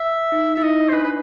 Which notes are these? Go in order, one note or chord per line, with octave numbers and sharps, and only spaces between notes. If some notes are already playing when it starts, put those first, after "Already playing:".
Already playing: E5
D#4
E4 E5
D#4 D#5
C5
D4 B4
B4